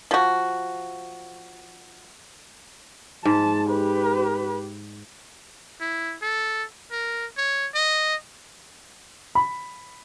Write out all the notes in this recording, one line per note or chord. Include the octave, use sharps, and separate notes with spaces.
F3 F#4
G#2 A5
G4 B4
E4
A4
A#4
C#5
D#5
B5